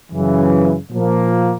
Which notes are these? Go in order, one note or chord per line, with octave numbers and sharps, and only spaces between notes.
F#2 C#3 E3
A#2 F3 A#3